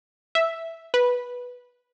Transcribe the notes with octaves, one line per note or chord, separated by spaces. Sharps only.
E5
B4